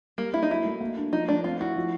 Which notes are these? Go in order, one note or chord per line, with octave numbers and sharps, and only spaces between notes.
G3 A#3
A#3 E4
D#4
F#3 E4
A3
A#3
D4
F3 D#4
A3 D4
C4 F4
E4 F#4
F3